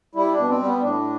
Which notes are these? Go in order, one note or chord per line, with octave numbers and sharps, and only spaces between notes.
G3 E4
D4
B2
C4
G3
B3
A2 D4